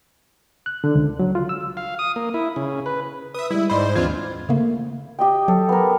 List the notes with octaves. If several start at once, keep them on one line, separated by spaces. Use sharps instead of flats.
F#6
D3
C#2
F#3
F4
E6
F5
D#6
A#3
E4
C#3
B4
B4 E5 D#6
G3 G#3 E4
G#2 C5 D5 D#5 B5
D#2 E3 C4 D4 F4 G#6
C#3 A3 A#3
G4 D#5 G5
F#3 A4
B3 A#4